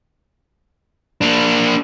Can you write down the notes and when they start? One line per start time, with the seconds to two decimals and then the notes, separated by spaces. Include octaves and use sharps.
1.21 A#3 D4